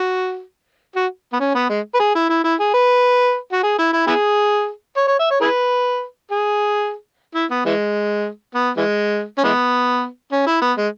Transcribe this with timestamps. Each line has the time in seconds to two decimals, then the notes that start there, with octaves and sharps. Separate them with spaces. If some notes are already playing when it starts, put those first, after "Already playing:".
Already playing: F#4
0.96 F#4
1.33 B3
1.40 C#4
1.55 B3
1.69 G#3
1.94 B4
2.00 G#4
2.15 E4
2.29 E4
2.44 E4
2.60 G#4
2.74 B4
3.52 F#4
3.63 G#4
3.79 E4
3.93 E4
4.07 B3 E4 G#4
4.97 C#5
5.07 C#5
5.19 E5
5.31 C#5
5.41 E4 G#4 B4
6.31 G#4
7.35 E4
7.50 B3
7.65 E3 G#3
8.54 B3
8.77 E3 G#3
9.38 C#4
9.44 E3 G#3 B3
10.32 C#4
10.47 E4
10.62 B3
10.77 G#3